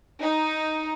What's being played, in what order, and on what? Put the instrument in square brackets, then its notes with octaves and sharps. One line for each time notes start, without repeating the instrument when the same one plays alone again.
[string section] D#4